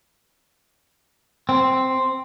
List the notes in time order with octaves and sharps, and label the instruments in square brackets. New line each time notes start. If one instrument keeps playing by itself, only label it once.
[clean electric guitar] C4